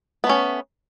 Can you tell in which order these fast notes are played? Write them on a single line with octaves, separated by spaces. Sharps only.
B3 A3 C#4